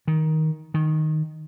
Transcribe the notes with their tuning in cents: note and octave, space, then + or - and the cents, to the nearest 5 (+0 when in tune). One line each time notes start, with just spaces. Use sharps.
D#3 +10
D#3 -5